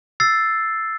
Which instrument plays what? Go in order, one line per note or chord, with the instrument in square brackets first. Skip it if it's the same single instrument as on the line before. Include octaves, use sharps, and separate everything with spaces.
[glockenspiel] E6 A6 C7